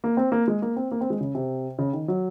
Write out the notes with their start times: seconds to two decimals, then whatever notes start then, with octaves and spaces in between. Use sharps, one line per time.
0.04 A#3
0.17 C4
0.32 A#3
0.48 G#3
0.62 A#3
0.76 C4
0.91 A#3
1.01 C4
1.10 G#3
1.20 C#3
1.35 C3
1.78 C#3
1.93 D#3
2.08 F#3